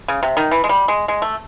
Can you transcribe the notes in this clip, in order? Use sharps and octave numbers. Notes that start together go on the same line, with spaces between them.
C#3
C3
D#3
E3
G#3
G3
G#3
G#3
A3